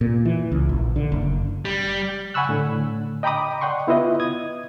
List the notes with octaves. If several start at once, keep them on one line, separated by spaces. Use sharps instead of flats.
A#2
E3
C#2
A#1
D3
F#1
G3
F#5 G#5 B5 C#6 E6 F#6
A2 D3
D#5 G5 A#5 B5 D6 D#6
D5 F#5 G5 C6 C#6
B3 E4 F4 B4 D#5
D#6 G#6